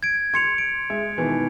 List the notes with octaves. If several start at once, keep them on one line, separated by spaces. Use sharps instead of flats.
G#6 D7
C6 G#6 C#7 F7
D7
G#3 E5
B2 D#3 E3